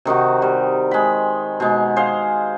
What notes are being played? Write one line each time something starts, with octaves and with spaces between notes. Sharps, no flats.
C3 D#3 D#4 F#4
G3
G#3 B5
B2 G#3
G#4 C5 F5